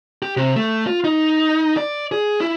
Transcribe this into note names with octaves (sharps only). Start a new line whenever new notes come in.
G4
C3
A3
F4
D#4
D5
G#4
E4